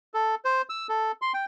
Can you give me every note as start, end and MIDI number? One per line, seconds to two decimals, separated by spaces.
0.14 0.35 69
0.45 0.62 72
0.69 0.87 88
0.89 1.12 69
1.22 1.32 84
1.34 1.45 79